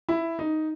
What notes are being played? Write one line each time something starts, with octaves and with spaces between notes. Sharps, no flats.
E4
D#4